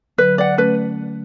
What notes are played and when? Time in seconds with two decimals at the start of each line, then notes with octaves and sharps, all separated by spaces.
0.18 D3 F#3 B4
0.38 D5 F#5
0.58 A3 C#4 B4